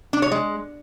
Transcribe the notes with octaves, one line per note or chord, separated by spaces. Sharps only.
D4
C#5
G#3